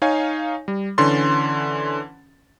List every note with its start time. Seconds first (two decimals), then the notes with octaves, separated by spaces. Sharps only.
0.02 D#4 C#5 F5 G#5
0.68 G3
0.98 D3 E3 C#4 C6 A6